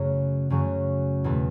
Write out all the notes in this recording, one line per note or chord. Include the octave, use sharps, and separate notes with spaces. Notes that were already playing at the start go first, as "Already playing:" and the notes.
Already playing: F#2 C#3 F#3 A3
F#2 C#3 F#3 A3
E2 B2 A3